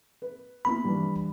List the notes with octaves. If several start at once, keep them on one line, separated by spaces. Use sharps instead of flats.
B4
A#3 B3 E4 B5
G2 E3